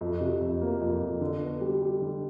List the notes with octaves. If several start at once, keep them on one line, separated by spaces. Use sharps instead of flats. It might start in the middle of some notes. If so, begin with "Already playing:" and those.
F2
C3
F2
A#3
F2
F2
D3
B3
G3
G3
D3